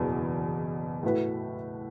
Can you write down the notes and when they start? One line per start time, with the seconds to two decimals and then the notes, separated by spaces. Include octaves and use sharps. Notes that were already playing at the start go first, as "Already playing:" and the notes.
Already playing: F#1 E2 B2 F#3
1.03 A2 A3 F#4 B4